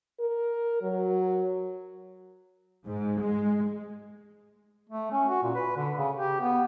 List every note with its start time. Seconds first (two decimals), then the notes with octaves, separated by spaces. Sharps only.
0.20 A#4
0.82 F#3
2.85 G#2
3.22 G#3
4.90 A3
5.12 C#4
5.29 F#4
5.43 A#2
5.55 B4
5.77 D3
5.98 C#3
6.16 G4
6.41 B3